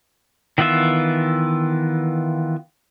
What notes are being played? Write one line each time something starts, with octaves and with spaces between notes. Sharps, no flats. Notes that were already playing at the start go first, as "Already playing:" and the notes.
D#3 E3 B3 F4 E5